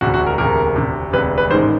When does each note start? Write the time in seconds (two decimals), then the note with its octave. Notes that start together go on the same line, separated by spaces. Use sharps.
0.01 E1 D2 C3 F#4
0.14 F#4
0.26 A#4
0.38 E1 D2 C3 A#4
0.76 E1 D2 C3
1.13 E1 D2 C3 B4
1.38 B4
1.50 A1 G#2 D#3 G#3 C5